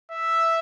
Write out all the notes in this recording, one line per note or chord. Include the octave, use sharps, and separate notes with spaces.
E5